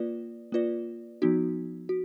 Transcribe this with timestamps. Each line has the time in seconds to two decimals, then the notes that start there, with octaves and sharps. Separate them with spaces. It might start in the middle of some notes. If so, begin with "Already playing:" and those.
Already playing: A#3 F4 B4 D5
0.52 A#3 F4 B4 D5
1.22 F3 B3 D#4 F#4
1.89 F#4